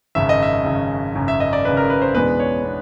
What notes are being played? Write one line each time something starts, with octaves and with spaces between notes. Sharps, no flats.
G#1 F#2 C#3 E5
D#5
E5
G#1 F#2 C#3
G#1 F#2 C#3
E5
D#5
D5
G#1 F#2 C#3 B4
A#4
B4
C5
E2 B2 G#3 B3 D4 B4
C#5
B3 D4